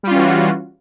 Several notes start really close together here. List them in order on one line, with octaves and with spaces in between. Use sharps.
G3 F4 C#4 E3 F#4